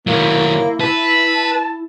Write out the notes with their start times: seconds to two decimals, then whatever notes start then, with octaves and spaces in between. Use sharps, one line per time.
0.07 D#3 F#3 A#3 E4
0.81 B4 A5